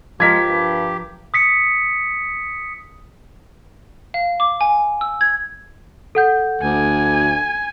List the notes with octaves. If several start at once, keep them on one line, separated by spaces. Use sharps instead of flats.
F3 G#3 G4 A#4 G#6 B6
G2
D#6 B6 C#7
F5
D6
G#5
E6
G#6
A4 F#5 G6
D2 G#5